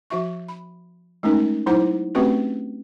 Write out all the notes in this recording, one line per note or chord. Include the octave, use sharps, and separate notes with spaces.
F3 F#4 E5 C#6
B5
G#3 A3 C#4 D#4 A#4
F#3 D#4 E4 C5 F#5 D6
A3 C4 C#4 F#4 G4 B4